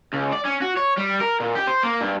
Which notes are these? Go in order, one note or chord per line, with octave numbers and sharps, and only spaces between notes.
C#2
D5
C#4
F#4
C#5
G3
A#4
A#2
G4
C5
A#3
G2